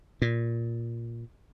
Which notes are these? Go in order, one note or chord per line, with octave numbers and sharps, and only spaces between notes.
A#2